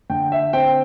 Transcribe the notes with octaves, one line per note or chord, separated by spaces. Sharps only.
D3 G5
E5
C4 G5